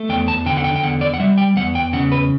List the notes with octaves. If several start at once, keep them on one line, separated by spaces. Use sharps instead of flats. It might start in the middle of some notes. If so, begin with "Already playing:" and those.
Already playing: A3
E2 G5
A5
D3 G5
F#5
G5
G5
E2 F#5
D5
F#5
G3 E5
G5
E2 F#5
G5
C#3 F#5
B4